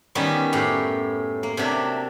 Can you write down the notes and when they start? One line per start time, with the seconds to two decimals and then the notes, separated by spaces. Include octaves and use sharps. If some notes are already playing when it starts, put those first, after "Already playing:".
0.15 D#3 G3 B3 C#4
0.52 F#2 A2 G4
1.43 A#3
1.57 C3 F#3 D4 E5